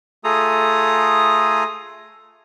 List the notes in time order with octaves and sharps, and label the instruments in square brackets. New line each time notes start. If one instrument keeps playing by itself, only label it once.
[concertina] A3 F4 G#4 A4 A#5 D#6